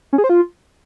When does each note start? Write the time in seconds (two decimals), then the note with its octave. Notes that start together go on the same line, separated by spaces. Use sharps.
0.13 C#4
0.18 G#4
0.24 C5
0.29 F4